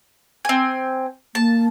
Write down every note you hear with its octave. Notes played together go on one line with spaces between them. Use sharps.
C4 G#5
A#3 A5